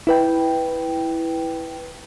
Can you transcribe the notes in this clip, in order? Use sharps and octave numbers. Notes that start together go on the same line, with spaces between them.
E4 B4 G5